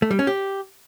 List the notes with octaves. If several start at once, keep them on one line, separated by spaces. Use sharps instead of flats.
A3
G3
C#4
G4